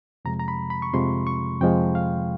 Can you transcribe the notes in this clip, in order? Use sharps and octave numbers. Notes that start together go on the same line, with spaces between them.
F2 C3 F3 G#3 A#5
A#5
B5
B5
C#6
F2 C3 F3 G#3 C6
C#6
F2 C3 F3 G#3 G5
F5